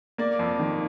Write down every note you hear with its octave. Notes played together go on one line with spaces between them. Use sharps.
A#3 D5
F2
D#3